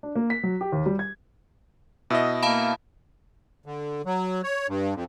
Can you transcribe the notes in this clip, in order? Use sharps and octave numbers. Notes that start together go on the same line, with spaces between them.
D4
A#3
B6
F#3
G4
D#2
G3
G#6
B2 E4 D#5 E5
A#3 F5 A5 B5
D3
F#3
C#5
G2
F2